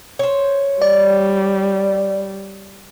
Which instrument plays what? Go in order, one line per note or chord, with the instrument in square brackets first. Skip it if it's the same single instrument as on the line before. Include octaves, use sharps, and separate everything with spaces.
[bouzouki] C5 C#5
[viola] G3 [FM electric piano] D5